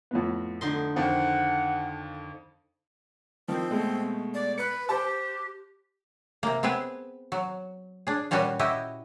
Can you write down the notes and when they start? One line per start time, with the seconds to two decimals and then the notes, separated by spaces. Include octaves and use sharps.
0.11 F2 A2 B3
0.61 D3 D#4 C6
0.96 F2 D#3 F3 C4 F#5
3.48 D#3 F3 C4
3.71 B2 G#3 A3
4.34 D5
4.58 B4 F#6 C#7
4.89 G4 C5 A5
6.43 C3 A#3
6.63 B3 C4 G#4 B4
7.32 F#3
8.07 D4 G#4
8.31 A#2 G3 C#4 F#4 B4 C#5
8.59 E4 F#4 G4 D#5